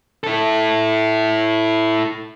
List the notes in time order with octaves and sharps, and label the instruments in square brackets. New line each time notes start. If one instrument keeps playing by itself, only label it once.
[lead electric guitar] E4 A4